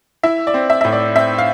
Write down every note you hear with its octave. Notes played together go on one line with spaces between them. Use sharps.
E4 E5
D5
C4
E5
A2 E5
D5
C4 E5
F5